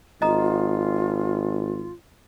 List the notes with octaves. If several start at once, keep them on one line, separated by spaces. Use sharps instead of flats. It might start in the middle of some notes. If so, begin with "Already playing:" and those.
G#1 F4 D#5 A#5 D#6